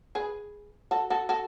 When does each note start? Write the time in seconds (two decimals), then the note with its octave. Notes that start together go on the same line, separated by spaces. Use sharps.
0.15 G#4 B4
0.91 F#4 A4
1.10 F#4 A4
1.29 F#4 A4